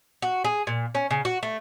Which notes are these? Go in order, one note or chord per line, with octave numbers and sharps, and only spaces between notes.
F#4
G#4
A#2
C#4
C#3
F#4
A3